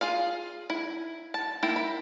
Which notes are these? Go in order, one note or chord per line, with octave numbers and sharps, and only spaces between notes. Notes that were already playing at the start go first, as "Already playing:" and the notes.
F4 G#4 F5
E4
A5
A#3 E4 G5
B5